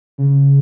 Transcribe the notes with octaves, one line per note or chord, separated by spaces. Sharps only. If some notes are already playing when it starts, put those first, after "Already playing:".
C#3